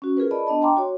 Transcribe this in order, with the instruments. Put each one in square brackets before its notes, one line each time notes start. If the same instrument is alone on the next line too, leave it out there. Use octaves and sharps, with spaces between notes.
[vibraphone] C#4 F#4
F4 G#4 A#4 B4
D5 D#5 A5 B5
B3 D4 D#5 A5
G5 A#5 C6 D6
F#4 C#5